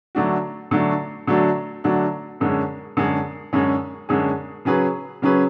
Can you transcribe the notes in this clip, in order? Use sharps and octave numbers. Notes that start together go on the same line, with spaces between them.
D3 F#3 A3 D4 F#4
D3 F#3 A3 D4 F#4
D3 F#3 A3 D4 F#4
D3 F#3 A3 D4 F#4
F#2 D3 G#3 C#4 G#4
F#2 D3 G#3 C#4 G#4
F#2 D3 G#3 C#4 G#4
F#2 D3 G#3 C#4 G#4
C#3 F#3 C#4 G#4 B4
C#3 F#3 C#4 G#4 B4